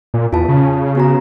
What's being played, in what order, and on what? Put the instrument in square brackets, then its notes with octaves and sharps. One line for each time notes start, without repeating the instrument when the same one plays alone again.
[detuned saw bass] A#2
[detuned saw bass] E2 [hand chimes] F4 A5
[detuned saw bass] C#3
[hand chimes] B3 F#4 A#5